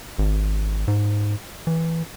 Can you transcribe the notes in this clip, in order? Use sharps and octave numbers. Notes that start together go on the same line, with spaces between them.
G#1
G#2
E3